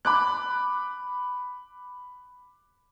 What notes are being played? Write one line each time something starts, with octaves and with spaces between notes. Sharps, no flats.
B5 D6 F#6